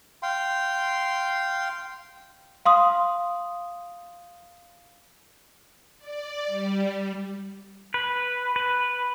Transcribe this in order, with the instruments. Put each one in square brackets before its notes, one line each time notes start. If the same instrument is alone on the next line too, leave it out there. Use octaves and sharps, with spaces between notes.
[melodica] F5 G5 C6
[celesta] F5 C6 D#6
[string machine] D5
G3
[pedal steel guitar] B4
B4